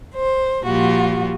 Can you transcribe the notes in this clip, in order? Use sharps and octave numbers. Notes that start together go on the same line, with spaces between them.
C5
A#2 F3 G3 F4 F#4